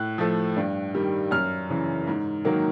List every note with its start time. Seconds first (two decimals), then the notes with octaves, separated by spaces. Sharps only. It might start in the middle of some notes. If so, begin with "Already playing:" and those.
Already playing: A2 F#6
0.18 F3 A3
0.57 G2
0.94 D#3 G3
1.31 F#2 F6
1.69 C#3 E3
2.07 G#2
2.45 D#3 F#3 A#3